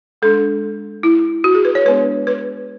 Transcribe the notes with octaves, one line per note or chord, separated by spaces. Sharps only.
G#3 D4 A4
E4
F#4
G#4
B4
C#5
G#3 B3 D4 B4
B4